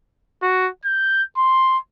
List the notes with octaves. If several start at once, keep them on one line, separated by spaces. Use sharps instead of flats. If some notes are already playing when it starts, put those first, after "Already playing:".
F#4
G6
C6